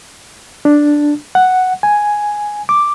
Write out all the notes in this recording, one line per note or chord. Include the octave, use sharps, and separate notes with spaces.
D4
F#5
G#5
D6